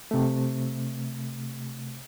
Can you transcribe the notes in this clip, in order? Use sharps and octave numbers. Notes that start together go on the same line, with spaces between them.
C3 A3